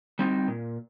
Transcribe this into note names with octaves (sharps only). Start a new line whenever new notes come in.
G3 C4 D#4
A#2